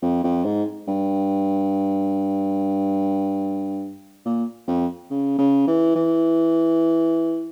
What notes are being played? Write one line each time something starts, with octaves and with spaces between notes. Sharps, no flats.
F2
F2
G#2
G2
A#2
F2
C#3
C#3
E3
E3